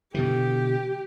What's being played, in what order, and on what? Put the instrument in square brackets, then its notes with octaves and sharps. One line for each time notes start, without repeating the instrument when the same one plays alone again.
[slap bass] B2 D3 E3 [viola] G4